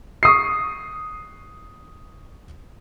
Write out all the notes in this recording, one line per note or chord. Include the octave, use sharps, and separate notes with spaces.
C#6 D#6 C7